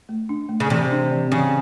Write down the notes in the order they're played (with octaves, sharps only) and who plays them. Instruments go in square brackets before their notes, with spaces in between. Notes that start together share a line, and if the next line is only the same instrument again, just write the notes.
[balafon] A3
D4
A3
[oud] C#3
[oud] C3 [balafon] E3
[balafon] D4
E3
[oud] C#3 [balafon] E3